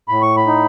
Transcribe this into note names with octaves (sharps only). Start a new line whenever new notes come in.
A2 B5
C#6
B5
D#4